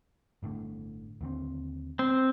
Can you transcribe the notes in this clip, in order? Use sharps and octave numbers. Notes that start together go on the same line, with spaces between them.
G1 A2 D3
D#2 D3 C4
C4